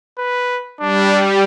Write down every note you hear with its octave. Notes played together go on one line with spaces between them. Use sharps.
B4
G3 D4